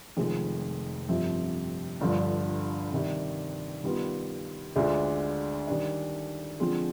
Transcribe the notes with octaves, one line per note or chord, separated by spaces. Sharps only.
F1 F2 D#3 G#3
G1 F2 C3 F3
G1 G2 D3 F3
C3 D#3 G3 D4
D#3 G3 B3 F4
D2 D3 G#3 D4 F4
D#3 G3 D4
D3 F3 G#3 C4 F4